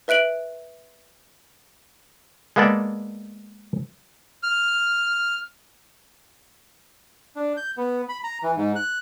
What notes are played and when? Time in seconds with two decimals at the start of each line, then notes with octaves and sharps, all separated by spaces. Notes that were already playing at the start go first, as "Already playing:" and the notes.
0.08 B4 E5 F#6 D7 F#7
2.56 G#3 A#3 B3 A4 D5
4.43 F6
7.36 D4
7.57 G6
7.77 B3
8.09 B5
8.24 A#5
8.43 E3
8.57 G#2
8.76 F#6